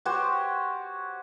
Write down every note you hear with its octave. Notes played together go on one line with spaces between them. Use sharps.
F#4 G4 C5 C#5